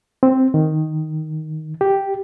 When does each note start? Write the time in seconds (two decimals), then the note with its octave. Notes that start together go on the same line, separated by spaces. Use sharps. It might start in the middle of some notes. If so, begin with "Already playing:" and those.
0.23 C4
0.54 D#3
1.81 G4